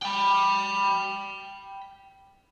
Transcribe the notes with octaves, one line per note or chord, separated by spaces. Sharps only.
G5 B5